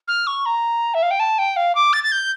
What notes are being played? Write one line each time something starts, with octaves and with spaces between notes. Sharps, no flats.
F6
C#6
A#5
E5
F5
G5
A5
G5
F5
D6
A6
A6
G6